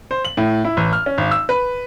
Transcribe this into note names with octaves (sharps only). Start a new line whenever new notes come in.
C5
F#7
A2
E4
A1
F6
C#4
G#1
E6
B4